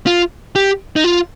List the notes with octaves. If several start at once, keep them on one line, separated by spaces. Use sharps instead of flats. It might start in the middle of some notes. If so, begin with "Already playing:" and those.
F4
G4
D#4
F4